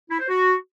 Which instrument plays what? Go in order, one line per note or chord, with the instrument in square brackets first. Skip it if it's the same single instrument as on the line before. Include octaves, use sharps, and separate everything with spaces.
[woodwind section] E4
C5
F#4